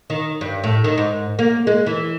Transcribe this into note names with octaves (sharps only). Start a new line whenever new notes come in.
D#3
G2
A2
D#3
G#2
A#3
G#3
E3